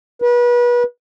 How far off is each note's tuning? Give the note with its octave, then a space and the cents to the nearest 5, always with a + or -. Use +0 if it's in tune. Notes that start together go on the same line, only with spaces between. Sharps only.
B4 -30